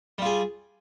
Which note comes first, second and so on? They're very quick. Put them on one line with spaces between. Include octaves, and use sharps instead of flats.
G3 F4 G#4